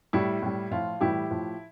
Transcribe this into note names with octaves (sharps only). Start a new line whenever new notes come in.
A2 G3 E4
A2 G3
A2 F3 F4
A2 E3 G3 E4 G4
A2 F3